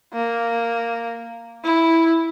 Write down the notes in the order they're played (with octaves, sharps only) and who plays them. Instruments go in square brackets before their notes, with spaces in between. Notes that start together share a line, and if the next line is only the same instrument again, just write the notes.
[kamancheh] A#3
E4